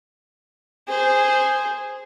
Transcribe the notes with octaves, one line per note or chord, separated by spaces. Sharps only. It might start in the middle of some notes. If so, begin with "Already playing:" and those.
G#4 C5